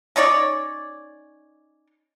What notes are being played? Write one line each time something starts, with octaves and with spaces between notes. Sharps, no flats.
C#4 D#4 C#5 D5